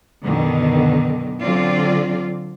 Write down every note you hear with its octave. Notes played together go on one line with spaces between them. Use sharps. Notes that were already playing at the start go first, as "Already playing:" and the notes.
F#2 B2 D3 D#3
D3 F#3 C4 F4 D5